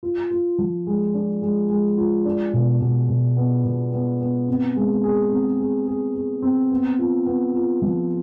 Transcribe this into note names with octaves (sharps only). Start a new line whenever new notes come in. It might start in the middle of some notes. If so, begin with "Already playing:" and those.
F4
F4
F3
G#3
D4
G#3
G#3
F4
D4
B2
B2
B2
B3
B2
B3
B3
C4
G#3
G#4
C4
G#4
G#4
G#4
C4
B3
F4
B3
F4
F3